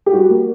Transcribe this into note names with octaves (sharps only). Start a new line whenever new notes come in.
G4
G3 F#4
A#3